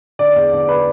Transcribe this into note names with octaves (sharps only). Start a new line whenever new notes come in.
D3 D5
E2
D3
B4